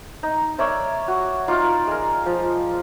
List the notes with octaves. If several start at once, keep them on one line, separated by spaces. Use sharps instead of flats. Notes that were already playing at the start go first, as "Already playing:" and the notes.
D#4
A#4 C#5 D5 E5
F#4
D#4 F4 D5 F5
G#3 A#4
F3